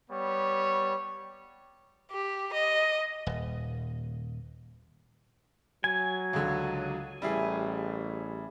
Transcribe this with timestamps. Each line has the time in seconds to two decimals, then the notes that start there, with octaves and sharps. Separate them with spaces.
0.10 G3 B3 C#5
2.12 G4
2.53 D#5
3.27 D#1
5.84 F#3 G#5 G#6
6.33 C#2 D3
7.22 A1 G3 E4 G#4